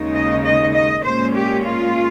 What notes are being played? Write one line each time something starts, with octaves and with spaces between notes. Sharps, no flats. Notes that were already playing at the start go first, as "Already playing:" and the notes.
Already playing: D#2 C#3 G#3 D#4
D#5
D#5
D#5
A#2 G#3 C#4 C5
G4
F4